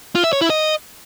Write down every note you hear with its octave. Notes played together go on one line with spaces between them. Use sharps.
F4
E5
C#5
E4
D#5